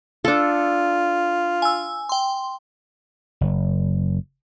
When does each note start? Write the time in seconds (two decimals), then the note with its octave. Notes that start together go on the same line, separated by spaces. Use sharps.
0.25 D4 F4 A4
1.62 G#5 E6
2.09 G5 C6
3.41 F#1